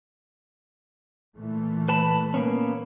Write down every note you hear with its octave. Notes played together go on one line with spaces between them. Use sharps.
A#2 E3 A3
B4 A5 B5
A#3 B3 C#4